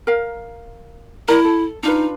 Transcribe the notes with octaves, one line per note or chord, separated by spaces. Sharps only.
A#4 F5
E4 A#4 D5 A#5
A4
D4 D#4 F4 B4